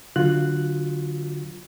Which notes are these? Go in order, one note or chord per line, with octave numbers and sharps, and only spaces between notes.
D3 F#3 F4 F#4 F#6